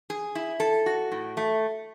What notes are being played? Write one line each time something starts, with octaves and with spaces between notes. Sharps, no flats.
G#4
E4
A4
F#4
A2
A3